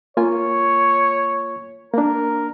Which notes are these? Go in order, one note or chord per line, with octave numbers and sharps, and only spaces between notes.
A#3 F4 C#5 G#5
A#3 D4 A#4